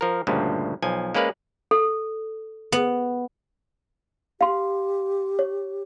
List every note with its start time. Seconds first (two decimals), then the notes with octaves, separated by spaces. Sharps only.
0.01 F3 A#4
0.27 D2 G2 A#2 C#3 F3
0.82 B1 F3 G#5
1.15 G#3 A#3 C#4 B4 D5 F5
1.71 A4
2.72 B3
4.41 G4 F5 C6
5.39 C#5